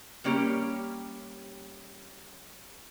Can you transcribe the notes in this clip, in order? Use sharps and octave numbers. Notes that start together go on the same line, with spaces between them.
G3 A#3 C#4 G4